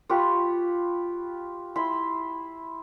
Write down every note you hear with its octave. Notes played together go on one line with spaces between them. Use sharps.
F4 G4 B4 C#6
E4 B5 C6